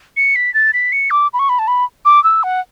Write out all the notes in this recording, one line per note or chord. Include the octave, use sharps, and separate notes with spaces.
C#7
B6
A6
B6
C#7
D6
B5
C#6
B5
A5
B5
D6
E6
F#5